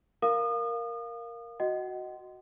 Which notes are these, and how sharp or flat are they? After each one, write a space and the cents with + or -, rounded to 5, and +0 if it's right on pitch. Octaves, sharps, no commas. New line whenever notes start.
A#4 +0 F5 +0 D#6 -35
F#4 +0 D#5 +0 F#5 +35